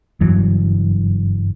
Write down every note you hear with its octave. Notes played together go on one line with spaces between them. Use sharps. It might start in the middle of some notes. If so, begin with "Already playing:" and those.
F#1 G2 E3 F#3